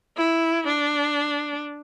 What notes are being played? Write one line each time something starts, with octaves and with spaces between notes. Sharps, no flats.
E4
D4